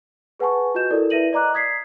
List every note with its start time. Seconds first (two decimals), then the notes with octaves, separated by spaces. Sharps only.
0.39 G#4 B4 F#5 G#5 A5 C#6
0.74 F4 F#4 B4 D#5 G6 E7
0.91 E4 A4 A#4 D5
1.10 E4 B4 E5 A#6 D#7 F#7
1.33 D5 D#5 A#5 D6 F#6
1.54 D#6 G#6 B6 C7